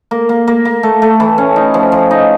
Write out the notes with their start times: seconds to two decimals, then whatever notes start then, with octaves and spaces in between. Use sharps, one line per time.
0.11 A#3
0.29 A#3
0.47 A#3
0.65 A#3
0.83 A3
1.02 A3
1.20 E3
1.38 C#4
1.56 D#4
1.74 F3
1.92 F3
2.11 D#4